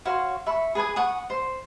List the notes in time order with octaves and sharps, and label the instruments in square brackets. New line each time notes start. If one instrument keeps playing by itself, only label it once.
[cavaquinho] F#4 C#5 F5 C6
E5 B5 C#6
G#4 B4 G#5 D#6
F#5 C#6 D#6
C5